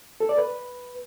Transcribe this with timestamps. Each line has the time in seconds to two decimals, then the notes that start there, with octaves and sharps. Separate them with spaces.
0.20 A4
0.29 D5
0.38 B4